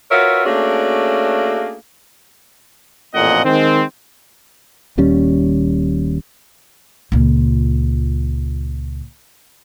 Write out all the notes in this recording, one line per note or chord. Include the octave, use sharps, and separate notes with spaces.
F4 F#4 A#4 B4 C#5 E5
A3 A#3 C#4 D4 F#4 G#4
A1 F2 A#2 D#5 F#5
D#3 G#3 C4
D#1 D#2 G3 C#4
C#2 A#2